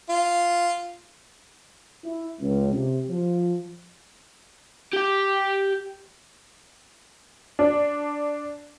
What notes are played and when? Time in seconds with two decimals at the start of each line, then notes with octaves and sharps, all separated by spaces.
0.09 F4
2.05 E4
2.41 C#2
2.72 C3
3.09 F3
4.93 G4 G5
7.59 D4